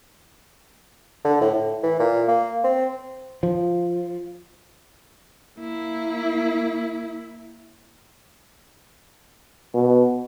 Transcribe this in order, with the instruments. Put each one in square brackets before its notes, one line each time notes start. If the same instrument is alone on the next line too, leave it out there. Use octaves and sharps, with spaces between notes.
[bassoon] D3
A2
A2
E3
A#2
A#3
C4
[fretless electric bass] F3
[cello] A#3 E4
[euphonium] B2